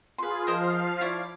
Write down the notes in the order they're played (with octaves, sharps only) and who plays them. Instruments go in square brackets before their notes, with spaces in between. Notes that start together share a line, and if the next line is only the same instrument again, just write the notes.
[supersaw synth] F4 G#4 [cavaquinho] B4 C6
[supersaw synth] F3 F5 [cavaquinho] A#4 C5 D#5
[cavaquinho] E4 C#5 D5